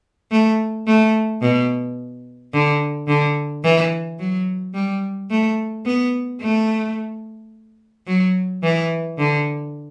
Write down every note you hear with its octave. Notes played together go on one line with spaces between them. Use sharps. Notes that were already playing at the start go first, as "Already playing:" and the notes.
A3
A3
B2
D3
D3
E3
F#3
G3
A3
B3
A3
F#3
E3
D3